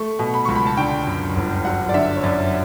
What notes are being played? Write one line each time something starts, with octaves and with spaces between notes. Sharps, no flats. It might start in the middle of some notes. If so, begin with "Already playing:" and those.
Already playing: A3 C#6
B2
B5
C#2 C#6
B5
A5
D3 G5
F#2
G1
F#3 F#5
D5
D3 E5
C#5
F#2 D5